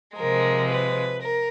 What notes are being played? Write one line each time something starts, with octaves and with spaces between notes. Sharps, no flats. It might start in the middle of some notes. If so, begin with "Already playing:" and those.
C3 F3 G#3 A#4
B4
A#4